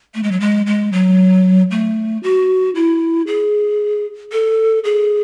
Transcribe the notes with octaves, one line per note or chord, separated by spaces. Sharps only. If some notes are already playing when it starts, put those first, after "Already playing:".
A3
G#3
F#3
G#3
G#3
F#3
A3
F#4
E4
G#4
A4
G#4